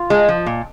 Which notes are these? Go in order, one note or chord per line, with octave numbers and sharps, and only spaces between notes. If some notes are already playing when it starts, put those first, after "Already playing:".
Already playing: F4
G#3
F3
A#2